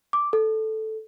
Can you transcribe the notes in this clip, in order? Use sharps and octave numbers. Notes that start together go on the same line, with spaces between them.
D6
A4